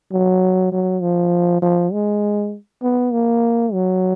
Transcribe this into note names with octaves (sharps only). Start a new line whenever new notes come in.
F#3
F#3
F3
F3
G#3
B3
A#3
F#3